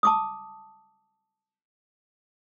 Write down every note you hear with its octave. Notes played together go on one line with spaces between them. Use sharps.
A5 D6 D#6